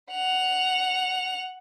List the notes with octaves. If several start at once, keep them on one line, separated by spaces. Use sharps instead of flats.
F#5 F7